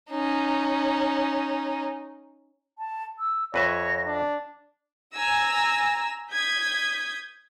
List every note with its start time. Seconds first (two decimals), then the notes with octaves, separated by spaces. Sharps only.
0.11 C#4 D#4
2.78 A5
3.19 E6
3.54 F2 B4 C#5 E5 A#6
4.06 D4
5.14 G#5 A#5 E6 A#6
6.31 D#6 G6 G#6 B6